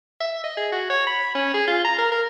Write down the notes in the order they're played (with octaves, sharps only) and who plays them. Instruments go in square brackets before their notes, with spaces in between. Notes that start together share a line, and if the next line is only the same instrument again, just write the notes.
[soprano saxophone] E5
D#5
G#4
F#4
C#5
B5
C#4
G#4
F4
A#5
A#4
A#4